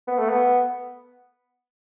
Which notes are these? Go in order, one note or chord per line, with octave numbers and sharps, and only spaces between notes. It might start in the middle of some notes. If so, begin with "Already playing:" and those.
B3
A3
B3